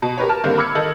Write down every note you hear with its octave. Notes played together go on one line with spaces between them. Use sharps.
B2
G4 A#4 B4 C#5
A#4 A5 F6
G2 D3 D#3 G3 A#3 C4
B5 D6 E6 F6 G#6 C#7
D#3 A4 D#5 F#7